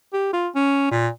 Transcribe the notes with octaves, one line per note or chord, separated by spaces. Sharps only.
G4
F4
C#4
A#2